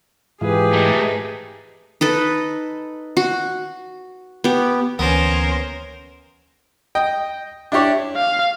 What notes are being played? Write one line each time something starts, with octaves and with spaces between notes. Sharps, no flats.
G#2 E3 F4 G4 G#4 B4
A3 D#4
D#4 A4 B4
F#4
B3 G4
D2 E3 A#3 B3 C#4 A#4 C5
D#5 G5
D4 E4 G4 C#5 D5
F5